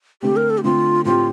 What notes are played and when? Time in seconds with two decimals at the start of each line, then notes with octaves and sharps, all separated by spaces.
0.23 D3 A3 C4 G4
0.37 A#4
0.50 A4
0.58 G4
0.64 D3 A3 C4 F4
1.05 A2 A3 C4 F4 G4